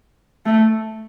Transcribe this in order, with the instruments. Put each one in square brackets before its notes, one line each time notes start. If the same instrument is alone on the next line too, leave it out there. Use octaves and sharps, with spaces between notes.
[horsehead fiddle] A3